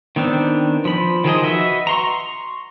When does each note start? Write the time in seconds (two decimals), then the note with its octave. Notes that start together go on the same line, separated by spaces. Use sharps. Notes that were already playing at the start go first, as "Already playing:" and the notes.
0.16 D#3 B3 C4 D4
0.85 F3 B5
1.24 D#3 F3 G#4 D#5
1.44 F#4 B4 D#5 E5
1.87 A#5 C6 C#6